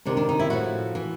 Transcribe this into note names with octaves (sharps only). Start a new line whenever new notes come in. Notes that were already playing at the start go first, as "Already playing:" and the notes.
D2 C3 D#3 D4
D4
D#4
E4
A2 F3 F#4
E3